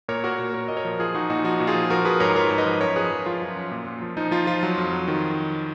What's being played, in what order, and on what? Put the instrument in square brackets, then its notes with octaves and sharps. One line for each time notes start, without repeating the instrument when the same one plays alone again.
[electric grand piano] A#2 A#4 C#5
A#2 F#4 A#4
A#2
A#2 A#4 C#5
A#2 D#5
A#4 C#5
F3
F3 F4 G#4
F3 D#4 F#4
A#2 D#4 F#4
F3 D#4 F#4
A#2
F4 G#4
F3
F3 F#4 A#4
F3 G#4 B4
G#2 A#4 C#5
F3 A#4 C#5
G#2
B4 D#5
F3
F#2 A#4 C#5
F3 G#4 B4
F3
F3 F4
F#2
F#2
A#2
A#2
F3
F3 D#4
F3 F4
F3 F4
F#3
F2
F#3
D#3